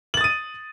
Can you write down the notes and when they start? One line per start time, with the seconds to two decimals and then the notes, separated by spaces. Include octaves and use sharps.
0.14 F#7
0.17 A6
0.21 D#6
0.24 D#7